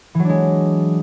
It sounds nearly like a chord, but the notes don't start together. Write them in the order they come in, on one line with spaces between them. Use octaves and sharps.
E3 F#3 D4 G#3